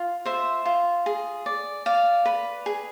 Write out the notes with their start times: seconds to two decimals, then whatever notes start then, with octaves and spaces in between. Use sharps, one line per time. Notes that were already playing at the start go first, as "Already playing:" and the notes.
Already playing: F4
0.25 C5 E5
0.65 F4
1.06 G#4
1.46 D5
1.86 D5 F5
2.26 B4
2.66 G#4